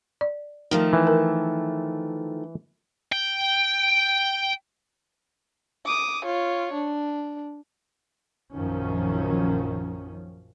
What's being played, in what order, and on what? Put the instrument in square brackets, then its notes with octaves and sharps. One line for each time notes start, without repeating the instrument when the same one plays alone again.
[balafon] D5
[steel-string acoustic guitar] D#3 F3 A3
[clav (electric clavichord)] E3
[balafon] A#4
[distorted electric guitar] G5
[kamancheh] D6 D#6
F4 C#5
D4
[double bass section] A#1 F#2 D#3 F3 C#4